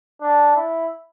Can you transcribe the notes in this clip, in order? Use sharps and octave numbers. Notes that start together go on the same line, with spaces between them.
D4
E4